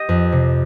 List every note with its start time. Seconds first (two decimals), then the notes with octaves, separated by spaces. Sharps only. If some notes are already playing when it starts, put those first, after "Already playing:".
Already playing: G4 D#5
0.09 F2
0.32 C3